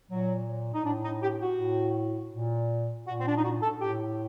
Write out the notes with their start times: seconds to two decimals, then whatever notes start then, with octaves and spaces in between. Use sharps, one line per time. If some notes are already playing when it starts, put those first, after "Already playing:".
0.11 A#2 F#3
0.74 D#4
0.85 A2 D4
1.04 D#4
1.23 G4
1.42 F#4
1.60 A2
2.33 A#2
3.07 A#2 F#4
3.20 C4
3.27 D4
3.37 D#4
3.45 F#4
3.63 A4
3.81 A2 G4